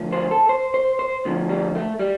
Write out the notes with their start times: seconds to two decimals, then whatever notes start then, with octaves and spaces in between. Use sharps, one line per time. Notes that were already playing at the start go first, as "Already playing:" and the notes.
Already playing: D2 D3 F3
0.12 C5
0.31 A4
0.49 C5
0.74 C5
0.99 C5
1.25 D2 D3 F3
1.49 G3
1.75 A3
1.99 G3